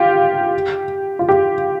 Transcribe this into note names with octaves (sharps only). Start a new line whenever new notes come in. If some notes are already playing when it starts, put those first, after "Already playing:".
Already playing: F4 G4
F4
G4